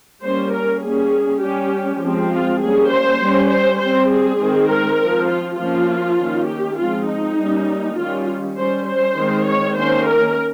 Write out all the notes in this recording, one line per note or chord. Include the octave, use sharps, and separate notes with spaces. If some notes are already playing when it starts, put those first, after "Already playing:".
G3 A#3 C#4 C5
A#4
G3 A#3 C#4 G#4
G3 C#4 G4
F3 G#3 C4
F4
G3 A#3 C#4 G#4
C5
G3 C#4
C5
G3 C4 C5
G#4
D#3 G#3 C4
A#4
F3 C4
F4
F3 A#3 C#4 F4
D#3 A#3 C#4
G4
F3 G#3 C4 F4
D#4
G3 A#3 C#4
D#3 G3 C#4 F4
G3 C#4 C5
C5
D#3 G#3 C4
C#5
D#3 A#3 C#4 C5
A#4